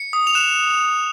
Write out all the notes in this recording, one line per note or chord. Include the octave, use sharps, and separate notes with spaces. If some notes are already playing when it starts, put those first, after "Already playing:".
Already playing: C#7
D#6
F7
F#6 E7